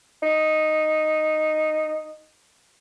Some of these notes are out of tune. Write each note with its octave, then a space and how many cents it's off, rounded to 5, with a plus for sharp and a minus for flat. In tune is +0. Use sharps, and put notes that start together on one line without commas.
D#4 -5